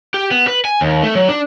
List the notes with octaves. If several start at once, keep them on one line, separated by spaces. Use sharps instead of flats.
G4
B3
B4
G#5
D#2
A3
F#3
D4